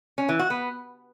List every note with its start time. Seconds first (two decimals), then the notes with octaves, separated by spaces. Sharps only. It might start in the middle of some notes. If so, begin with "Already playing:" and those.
0.18 C#4
0.29 E3
0.39 F#4
0.50 B3